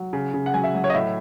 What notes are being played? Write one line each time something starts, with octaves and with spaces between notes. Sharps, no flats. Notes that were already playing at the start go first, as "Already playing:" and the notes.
Already playing: F#3
C#3
C#3
F#5
F#3 G#5
E5
F#3
C#5
D#5
A2 E5